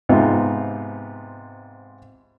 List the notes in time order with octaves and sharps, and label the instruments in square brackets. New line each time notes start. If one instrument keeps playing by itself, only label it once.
[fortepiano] G#2 C3 B3 D#4 F4